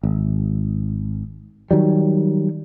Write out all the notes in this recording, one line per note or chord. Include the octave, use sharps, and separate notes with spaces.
G#1
D#3 F#3 G3